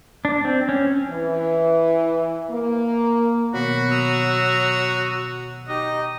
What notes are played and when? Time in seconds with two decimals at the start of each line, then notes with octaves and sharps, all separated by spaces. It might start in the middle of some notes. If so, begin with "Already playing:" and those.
0.25 D4
0.45 C4
0.69 C#4
1.10 E3
2.50 A#3
3.54 B2 D#3 F#3 B3 F#4 B5
3.91 A#5 D#6 E6
5.69 D#4 G4 D#5